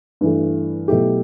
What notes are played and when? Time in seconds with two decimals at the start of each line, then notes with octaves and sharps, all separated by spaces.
0.21 G2 E3 A3
0.88 B2 F#3 A3 E4 G4